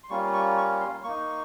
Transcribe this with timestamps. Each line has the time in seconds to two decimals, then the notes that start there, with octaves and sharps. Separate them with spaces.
0.04 C6
0.10 G3 A#3 C#4 F4 C#6
0.33 C#6
0.57 C#6
0.80 C6
1.04 A#3 D#4 C#6